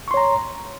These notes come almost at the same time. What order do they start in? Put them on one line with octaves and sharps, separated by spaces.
C#6 C6 C#5 A#5